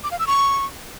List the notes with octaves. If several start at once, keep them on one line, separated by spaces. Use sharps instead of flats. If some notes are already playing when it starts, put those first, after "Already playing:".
D6
F5
E6
C#6